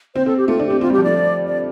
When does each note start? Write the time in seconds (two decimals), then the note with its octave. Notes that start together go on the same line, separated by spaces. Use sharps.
0.15 C4 C5
0.26 C4 A4
0.37 G4
0.48 A3 F4
0.59 D4
0.65 G4
0.70 C4
0.81 C4 F4
0.90 G3
0.93 G4
0.98 F3
1.04 A3 D5
1.47 D5